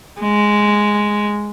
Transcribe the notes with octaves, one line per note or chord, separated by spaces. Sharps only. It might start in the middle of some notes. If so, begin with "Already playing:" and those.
G#3